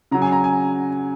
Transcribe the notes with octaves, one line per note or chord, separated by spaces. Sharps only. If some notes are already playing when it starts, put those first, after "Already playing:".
C#3 F#3 A#5
G#5
A#5
G#5